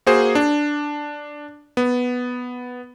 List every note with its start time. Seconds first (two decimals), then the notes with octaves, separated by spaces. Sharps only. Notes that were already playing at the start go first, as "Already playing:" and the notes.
0.06 A#3 F#4 G#4 C5
0.35 D4
1.77 B3